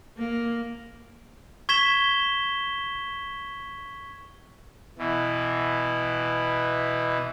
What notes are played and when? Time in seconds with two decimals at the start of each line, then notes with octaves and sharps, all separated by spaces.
0.17 A#3
1.69 C#6 G#6 B6 E7 G7
4.98 B2 E3